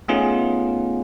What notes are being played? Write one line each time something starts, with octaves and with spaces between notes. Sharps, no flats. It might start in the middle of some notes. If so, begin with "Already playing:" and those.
A3 B3 C#4 D#4 F4 G#4